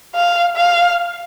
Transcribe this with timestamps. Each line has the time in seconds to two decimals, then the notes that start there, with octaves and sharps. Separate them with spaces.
0.15 F5
0.57 F5